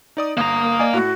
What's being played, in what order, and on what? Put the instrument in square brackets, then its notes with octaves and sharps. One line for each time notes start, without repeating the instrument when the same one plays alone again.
[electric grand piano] D#4 D5 D#6
[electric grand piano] G1 [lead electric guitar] A#3 A#5 [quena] D#6
[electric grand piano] D5 D#5 G#5
[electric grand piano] A2 [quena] F#4